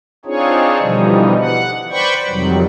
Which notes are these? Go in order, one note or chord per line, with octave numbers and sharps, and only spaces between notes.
C4 D4 D#4 F4 G#4 C#5
B2 D3 E3 F3 G3 D#4
F#5
B4 C5 D5 G5 B5 C#6
F2 C3 D#3 F#3 G3